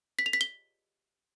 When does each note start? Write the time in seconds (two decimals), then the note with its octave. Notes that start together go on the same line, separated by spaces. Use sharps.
0.19 B6
0.26 F7
0.33 B6
0.41 G7